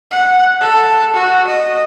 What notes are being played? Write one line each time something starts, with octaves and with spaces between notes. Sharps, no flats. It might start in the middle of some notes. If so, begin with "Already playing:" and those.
F#5
A4
F#4
D#5